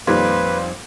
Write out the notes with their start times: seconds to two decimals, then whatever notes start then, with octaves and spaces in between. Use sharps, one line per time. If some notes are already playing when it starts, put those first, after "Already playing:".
0.07 F2 A#2 D#3 G3 B4 F5 C6 G#6